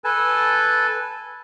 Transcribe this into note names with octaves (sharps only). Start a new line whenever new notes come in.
A4 B4 G#5 A5